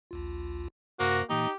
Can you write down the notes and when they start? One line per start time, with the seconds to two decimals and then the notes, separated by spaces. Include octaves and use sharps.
0.11 A#1 D#2 F4
0.99 F#2 C3 A#3 F#4 C5
1.30 A#2 E3 A#3 D#4 G4